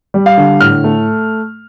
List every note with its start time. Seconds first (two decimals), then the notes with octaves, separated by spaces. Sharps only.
0.14 G3
0.26 F5
0.37 D3
0.60 A2 F6
0.84 A3